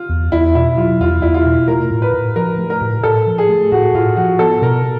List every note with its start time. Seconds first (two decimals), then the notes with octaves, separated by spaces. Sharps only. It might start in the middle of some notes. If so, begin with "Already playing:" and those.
Already playing: F4
0.09 E2
0.32 E2 E4
0.55 B2 E4
0.77 F#3 F4
1.00 E2 F4
1.22 E2 E4
1.34 F4
1.45 B2
1.68 A3 A#4
1.91 A2
2.02 B4
2.14 A2
2.36 F3 A#4
2.58 A3
2.70 A#4
2.81 A2
3.03 A2 A4
3.27 F3
3.38 G#4
3.49 A3
3.72 A2 F#4
3.94 A2 F4
4.16 F3 F#4
4.39 B3 A4
4.62 B2 A#4